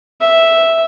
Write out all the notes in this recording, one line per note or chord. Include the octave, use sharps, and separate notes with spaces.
E5